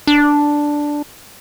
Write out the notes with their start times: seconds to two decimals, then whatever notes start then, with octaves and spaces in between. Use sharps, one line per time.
0.07 D4